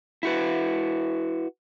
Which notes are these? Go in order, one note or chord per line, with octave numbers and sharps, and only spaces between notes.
E4 F#4 B4